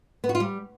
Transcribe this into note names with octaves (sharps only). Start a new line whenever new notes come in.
B3
F#4
F4
G3